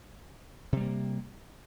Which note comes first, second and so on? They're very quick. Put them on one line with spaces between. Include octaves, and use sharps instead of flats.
C3 G3 A#3